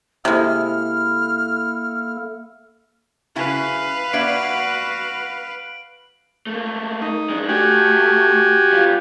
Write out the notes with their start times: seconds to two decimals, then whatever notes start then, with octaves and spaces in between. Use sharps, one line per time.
0.25 C3 G#3 A#3 E4 A4 F6
3.36 C#3 E4 F#4 B4 F5
4.13 A#3 D4 F#4 E5 D7 F#7
6.47 A3 A#3
7.02 D#4
7.30 G#3 D4
7.49 A3 F#4 G4 G#5
8.72 G3 F4